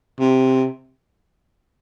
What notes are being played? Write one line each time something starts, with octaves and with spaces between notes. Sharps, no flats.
C3